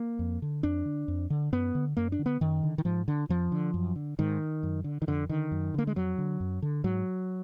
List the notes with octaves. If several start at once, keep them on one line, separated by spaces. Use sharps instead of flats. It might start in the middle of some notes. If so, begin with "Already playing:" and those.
Already playing: A#3
F2
D3
F2 D4
D3
F2
D3
F#2 B3
D3
F#2 A#3
D4
D3
B3
F#2 D#3
D3
D#3
G#2 F3
D3
F2 F3
D3
F#2
D3
G#2 D#3
F#2
D3
D#3
F2 D3
D3 D#3
F#2
D3 A#3
G#3
F2 F#3
D3
F#2
D3
G#2 F#3